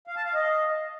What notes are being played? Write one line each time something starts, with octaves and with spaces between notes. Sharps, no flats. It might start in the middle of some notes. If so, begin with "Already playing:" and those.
F5
A5
F5
D#5